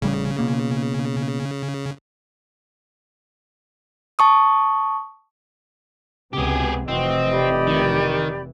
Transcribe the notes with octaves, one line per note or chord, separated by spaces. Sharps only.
A1 C#3 G3
B2 A#3
A5 C#6 D#6
C#2 C3 B3 G4 G#4
F1 E3 C4 F#4 D#5
G4 D5 B5
D#3